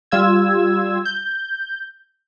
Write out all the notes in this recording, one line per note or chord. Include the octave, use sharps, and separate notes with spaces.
G3 F4 E6 G#6
G6